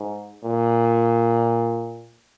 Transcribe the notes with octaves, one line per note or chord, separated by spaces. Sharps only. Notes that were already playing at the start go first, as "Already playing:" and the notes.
Already playing: G#2
A#2